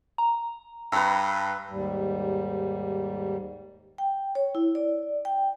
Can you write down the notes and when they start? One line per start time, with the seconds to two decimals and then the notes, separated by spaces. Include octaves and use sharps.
0.18 A#5
0.92 G2 B4 A#5 E6
1.69 D#2 G#2 G3
3.98 G5
4.35 C#5
4.55 E4
4.75 D5
5.25 G5